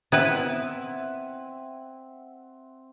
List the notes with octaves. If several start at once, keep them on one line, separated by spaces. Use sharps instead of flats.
B3 C4 E4 B4 E5 F#5